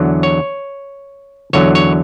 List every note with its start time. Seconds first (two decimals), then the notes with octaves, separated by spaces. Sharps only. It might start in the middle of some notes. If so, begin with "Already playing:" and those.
Already playing: E2 D3 F#3
0.23 C#5
1.53 E2 D3 F#3 C#5
1.75 C#5